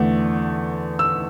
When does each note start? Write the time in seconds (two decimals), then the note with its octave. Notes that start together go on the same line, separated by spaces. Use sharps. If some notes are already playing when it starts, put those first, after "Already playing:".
Already playing: E2 D3 A3
0.99 E6